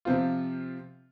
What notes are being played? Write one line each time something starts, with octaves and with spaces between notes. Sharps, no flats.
C3 F3 C4 F4